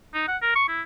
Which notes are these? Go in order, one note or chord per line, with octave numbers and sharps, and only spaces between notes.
D#4
F#5
A#4
C#6
E4